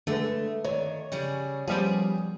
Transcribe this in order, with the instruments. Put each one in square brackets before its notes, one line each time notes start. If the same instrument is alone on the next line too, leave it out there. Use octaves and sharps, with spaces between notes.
[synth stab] D3 [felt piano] G#3 B4 [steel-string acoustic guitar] A3
[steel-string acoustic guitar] D#3 [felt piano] C#5 D5
[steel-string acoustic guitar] C#3 G3 G#4
[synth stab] F3 G3 [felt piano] B3 C#4 [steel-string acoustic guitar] G#4